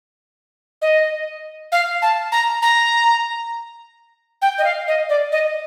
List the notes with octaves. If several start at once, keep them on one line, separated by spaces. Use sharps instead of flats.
D#5
F5
A5
A#5
A#5
G5
D#5
F5
D#5
D5
D#5